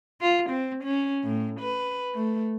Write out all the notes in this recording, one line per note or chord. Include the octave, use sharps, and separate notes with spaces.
F4
C4
C#4
A2
B4
A3